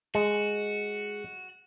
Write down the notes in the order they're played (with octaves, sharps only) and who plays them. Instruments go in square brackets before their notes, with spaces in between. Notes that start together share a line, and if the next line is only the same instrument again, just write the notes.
[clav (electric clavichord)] G#3 [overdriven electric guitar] F#4